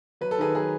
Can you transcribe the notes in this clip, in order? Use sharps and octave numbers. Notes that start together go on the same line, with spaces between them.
F#3 B4
A4
D#3 G#4 B4
F#3 G#4 B4